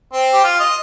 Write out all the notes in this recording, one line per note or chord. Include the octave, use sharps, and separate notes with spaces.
C4
G4
F4
D#5